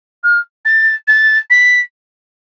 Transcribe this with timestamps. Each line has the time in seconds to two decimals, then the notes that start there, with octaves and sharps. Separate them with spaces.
0.23 F6
0.65 A6
1.07 A6
1.50 B6